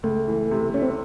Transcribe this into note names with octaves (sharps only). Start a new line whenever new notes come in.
C#2 A3
E3
C3
A3 C#4
C4